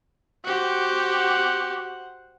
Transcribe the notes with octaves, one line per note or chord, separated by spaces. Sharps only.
F#4 G4 C5 F#5